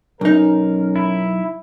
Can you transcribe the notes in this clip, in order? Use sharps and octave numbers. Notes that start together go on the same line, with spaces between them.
B1 C#4 D#4 A#4
E4